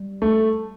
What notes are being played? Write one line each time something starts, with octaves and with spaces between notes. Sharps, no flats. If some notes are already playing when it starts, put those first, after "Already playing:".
Already playing: G3
A3